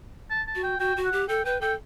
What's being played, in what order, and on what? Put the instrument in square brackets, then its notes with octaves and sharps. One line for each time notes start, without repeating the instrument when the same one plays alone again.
[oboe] A5
A5
[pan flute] F#4
[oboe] G5
[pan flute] F#4 [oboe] G5
[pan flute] F#4
[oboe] F#5
[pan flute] G4
[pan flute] A4 [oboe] G5
[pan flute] B4 [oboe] G5
[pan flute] A4 [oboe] G5